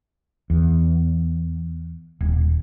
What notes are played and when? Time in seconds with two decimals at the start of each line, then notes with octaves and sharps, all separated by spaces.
0.50 E2
2.21 D#1